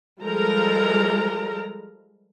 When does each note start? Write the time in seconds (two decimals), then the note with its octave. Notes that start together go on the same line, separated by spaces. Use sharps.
0.22 F3 G3 G#3 A4 A#4 A#5